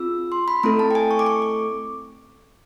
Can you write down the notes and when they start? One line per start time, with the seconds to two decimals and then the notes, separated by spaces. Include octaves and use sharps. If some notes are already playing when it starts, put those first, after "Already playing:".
Already playing: C4 F4 G#4 E6
0.32 C6
0.48 B5
0.63 A3 C4 E4 A4 A#5
0.79 A5
0.91 G5
0.95 G#5
1.11 C#6
1.19 D6
1.26 C#6
1.42 D6